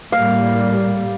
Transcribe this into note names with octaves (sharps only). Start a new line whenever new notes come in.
A2 G3 A#3 F5